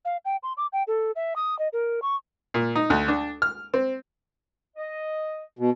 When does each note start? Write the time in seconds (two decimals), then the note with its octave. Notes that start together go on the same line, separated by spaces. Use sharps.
0.05 F5
0.25 G5
0.43 C6
0.57 D6
0.73 G5
0.87 A4
1.16 E5
1.36 D#6
1.59 D#5
1.73 A#4
2.02 C#6
2.54 A#2
2.75 D#4
2.90 D2
3.08 D4
3.42 F6
3.74 C4
4.76 D#5
5.59 B2